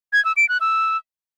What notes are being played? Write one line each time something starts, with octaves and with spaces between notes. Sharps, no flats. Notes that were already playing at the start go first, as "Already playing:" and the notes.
G#6
E6
D7
F#6
E6